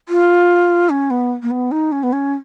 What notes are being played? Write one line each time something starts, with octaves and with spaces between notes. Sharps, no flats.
F4
C#4
B3
A#3
B3
D#4
C#4
B3
C#4